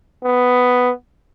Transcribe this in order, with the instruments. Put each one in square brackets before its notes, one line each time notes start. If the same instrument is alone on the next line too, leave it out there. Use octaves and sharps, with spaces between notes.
[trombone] B3